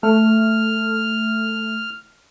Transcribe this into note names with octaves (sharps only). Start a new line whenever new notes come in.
A3 F6